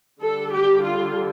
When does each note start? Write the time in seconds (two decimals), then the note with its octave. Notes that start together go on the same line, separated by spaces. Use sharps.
0.22 D3 G3 D4 A4
0.52 G4
0.83 F4